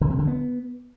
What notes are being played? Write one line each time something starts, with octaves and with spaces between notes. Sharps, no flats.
D3
C3
D3
B3